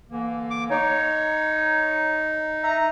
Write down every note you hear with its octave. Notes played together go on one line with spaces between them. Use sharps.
D3 E3 A#3
D6
D#4 C#5
D#5 E5 A#5